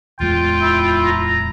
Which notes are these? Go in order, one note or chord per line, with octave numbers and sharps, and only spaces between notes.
D1 E2 G#3 F4 G5
E4
A#5